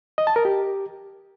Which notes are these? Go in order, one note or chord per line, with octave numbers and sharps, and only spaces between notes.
D#5
A5
A#4
G4